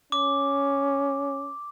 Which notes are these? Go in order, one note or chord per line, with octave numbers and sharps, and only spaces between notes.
C#4 D6